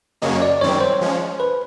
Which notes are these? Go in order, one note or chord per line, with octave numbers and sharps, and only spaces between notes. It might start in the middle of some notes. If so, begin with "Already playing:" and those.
F#2 C#3 F#3 A#3 C#4 D#5
D5
F#2 D#3 G3 C4 C#5
C5
F3 G#3 C#4
B4